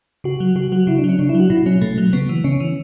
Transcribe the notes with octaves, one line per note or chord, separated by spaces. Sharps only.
C#3 F#4
F#3
C#3 F#4
F#3 F#4
C#3 E4
D4
F#3
C#4
C#3 D4
E4
F#3
F#4
B2 E4
F#3 C#4
B2 A3
F#3
C#3 B3
E3
C#3 C#4
E3